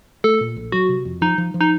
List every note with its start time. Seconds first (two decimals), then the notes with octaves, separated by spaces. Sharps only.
0.24 A3 A4
0.41 A#2
0.56 A#1
0.72 F#3 F#4
0.89 C3
1.05 F2
1.21 F3 D#4
1.38 F3
1.54 F3
1.61 D#4